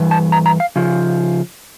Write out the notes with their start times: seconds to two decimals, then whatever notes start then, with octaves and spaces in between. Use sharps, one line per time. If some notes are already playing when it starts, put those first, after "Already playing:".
Already playing: G2 E3
0.11 A5
0.32 A#5
0.46 A#5
0.60 F5
0.76 C#3 F3